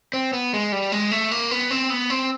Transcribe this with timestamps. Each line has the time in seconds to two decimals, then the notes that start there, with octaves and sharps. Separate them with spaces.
0.14 C4
0.33 B3
0.53 G#3
0.72 G3
0.92 G#3
1.11 A3
1.31 A#3
1.51 B3
1.71 C4
1.90 B3
2.10 C4